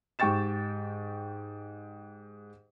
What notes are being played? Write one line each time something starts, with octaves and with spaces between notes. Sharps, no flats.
G#2 G4 G5 C#6 A6 E7